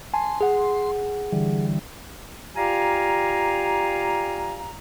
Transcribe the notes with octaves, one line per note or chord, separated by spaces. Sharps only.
G#5 A5 C6
G#4 F#5
D3 E3 G3
F4 G4 D5 F5 G#5 A#5